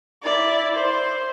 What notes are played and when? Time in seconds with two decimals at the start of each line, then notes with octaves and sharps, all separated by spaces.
0.23 E4 D5
0.73 C5